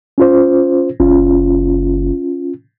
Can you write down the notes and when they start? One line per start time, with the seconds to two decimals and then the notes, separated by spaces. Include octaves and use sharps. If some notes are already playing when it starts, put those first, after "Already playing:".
0.18 C#4 F4 C5
1.00 F#1 C#4 F4